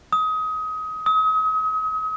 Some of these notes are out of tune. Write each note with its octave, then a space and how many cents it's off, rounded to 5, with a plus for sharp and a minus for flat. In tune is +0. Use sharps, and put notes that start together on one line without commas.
D#6 +25
D#6 +40